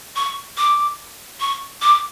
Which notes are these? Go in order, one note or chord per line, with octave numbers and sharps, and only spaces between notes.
C#6
D6
C#6
D6